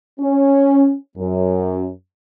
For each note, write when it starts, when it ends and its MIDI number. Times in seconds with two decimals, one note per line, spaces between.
0.20 0.94 61
1.17 1.88 42